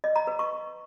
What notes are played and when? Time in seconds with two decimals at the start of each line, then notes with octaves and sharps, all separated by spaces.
0.04 D#5
0.16 A#5
0.27 B4
0.39 C#6